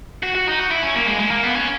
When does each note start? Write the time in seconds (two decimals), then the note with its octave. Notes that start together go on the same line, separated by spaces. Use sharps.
0.23 F#4
0.35 F#4
0.47 D#4
0.59 F#4
0.71 E4
0.83 C#4
0.95 A#3
1.07 G#3
1.19 G#3
1.31 A#3
1.44 B3
1.56 C#4